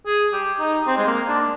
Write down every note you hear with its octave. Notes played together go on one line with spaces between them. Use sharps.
G#4
G4
D#4
C4
G#3
A#3
D4